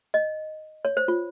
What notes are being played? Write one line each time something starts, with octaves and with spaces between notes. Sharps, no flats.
D#5
C#5
C5
F4